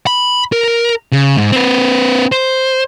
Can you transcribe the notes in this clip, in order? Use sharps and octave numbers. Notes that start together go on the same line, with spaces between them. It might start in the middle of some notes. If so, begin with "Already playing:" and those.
B5
A#4
C#3
G#2
C4 B4
C5